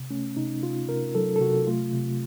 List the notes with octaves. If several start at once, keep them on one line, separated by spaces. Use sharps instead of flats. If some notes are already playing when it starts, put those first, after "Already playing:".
Already playing: C3
A3 C#4
C3 D#4
C3 F4
C3 A#4
F#3 A4
A4
C3 F#4
A3 F4
C3